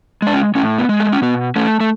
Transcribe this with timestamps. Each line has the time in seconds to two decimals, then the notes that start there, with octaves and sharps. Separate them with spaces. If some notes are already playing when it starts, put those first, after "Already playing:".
0.22 G#3 D4
0.33 C#4
0.55 A2 C#4
0.78 B3
0.89 G#3
1.00 A3
1.12 C#4
1.22 B2 B3
1.56 A3 C#4
1.80 A3